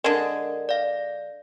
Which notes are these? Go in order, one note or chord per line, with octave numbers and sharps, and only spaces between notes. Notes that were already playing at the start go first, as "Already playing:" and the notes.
D3 G#3 A#4 G#6
D5 F5